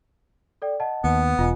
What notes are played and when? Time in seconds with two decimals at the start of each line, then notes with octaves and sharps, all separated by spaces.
0.62 A4 D5 G5
0.80 D#5 F#5 A5
1.04 D#2 B3
1.39 E1 F4 D#5 G#5